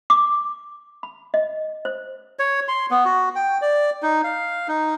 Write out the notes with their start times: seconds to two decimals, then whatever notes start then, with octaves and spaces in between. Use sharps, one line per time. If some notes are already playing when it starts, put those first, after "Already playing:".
0.10 D6
1.03 B5
1.34 D#5
1.85 C5
2.39 C#5
2.68 C6
2.91 B3
3.05 F#4
3.36 G5
3.62 D5
4.03 D#4
4.24 F5
4.68 D#4